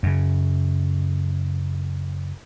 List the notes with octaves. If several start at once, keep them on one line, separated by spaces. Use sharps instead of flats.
F#2 C#3